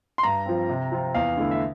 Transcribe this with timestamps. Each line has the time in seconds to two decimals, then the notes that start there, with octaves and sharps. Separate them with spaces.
0.18 C6
0.23 G2 A#5
0.46 F3 C4
0.70 C3
0.92 F3 C4 F4
1.15 E2 F5
1.37 D3 A3 E4
1.51 E5